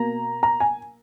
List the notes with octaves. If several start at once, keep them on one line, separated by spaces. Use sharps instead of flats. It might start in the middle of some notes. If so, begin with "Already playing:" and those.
Already playing: B2 A#3 A#5
A#5
G#5